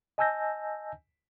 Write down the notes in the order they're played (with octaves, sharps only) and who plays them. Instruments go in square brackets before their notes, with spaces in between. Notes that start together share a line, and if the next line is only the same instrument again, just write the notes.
[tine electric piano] D#5 G#5 A5 E6 G6 A#6